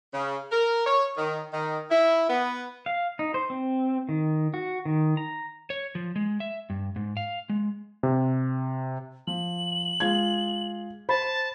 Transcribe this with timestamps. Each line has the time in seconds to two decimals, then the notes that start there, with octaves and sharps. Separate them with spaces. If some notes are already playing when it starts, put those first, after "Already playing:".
0.14 C#3
0.52 A#4
0.86 C#5
1.17 D#3
1.53 D#3
1.90 E4
2.29 B3
2.86 F5
3.19 D#4
3.34 C5
3.50 C4
4.09 D#3
4.54 F#4
4.85 D#3
5.17 A#5
5.70 C#5
5.95 F3
6.16 G#3
6.40 E5
6.70 G2
6.96 G#2
7.17 F5
7.50 G#3
8.03 C3
9.27 F3 F#7
10.00 G#3 F4 G#6
11.09 C5 A5 B5